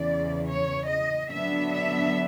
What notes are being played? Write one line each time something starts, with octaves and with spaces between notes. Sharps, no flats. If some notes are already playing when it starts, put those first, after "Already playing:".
Already playing: E2 C#3 E3 D5
C#5
D#5
D3 F#3 B3 D4 E5
E5